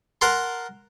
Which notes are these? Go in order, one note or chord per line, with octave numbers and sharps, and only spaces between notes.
A#4 F#5 A5 A#5 C6